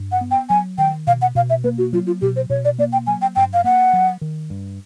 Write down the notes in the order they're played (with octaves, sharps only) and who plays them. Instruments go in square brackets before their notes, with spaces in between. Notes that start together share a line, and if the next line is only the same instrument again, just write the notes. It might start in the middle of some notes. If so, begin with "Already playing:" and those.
Already playing: [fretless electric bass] G2
[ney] F#5
[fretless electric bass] B3
[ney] G5
[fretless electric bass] F#3 [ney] G#5
[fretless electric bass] D#3 [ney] G5
[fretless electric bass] B2 [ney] F5
[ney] F#5
[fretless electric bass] B2 [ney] F5
[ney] E5
[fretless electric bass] A#3 [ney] B4
[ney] F#4
[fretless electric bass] F#3 [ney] F4
[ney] F4
[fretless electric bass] B2 [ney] G4
[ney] C5
[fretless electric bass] B2 [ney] C#5
[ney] D5
[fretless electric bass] A#3 [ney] D5
[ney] G5
[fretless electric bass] F#3 [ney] G#5
[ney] G5
[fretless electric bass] G2 [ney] G5
[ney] F5
[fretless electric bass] A#3 [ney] F#5
[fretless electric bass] F#3
D#3
G2